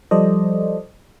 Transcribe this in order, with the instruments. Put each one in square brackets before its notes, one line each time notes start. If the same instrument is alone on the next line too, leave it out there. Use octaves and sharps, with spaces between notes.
[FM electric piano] F3 G3 A4 C5 D5 D#5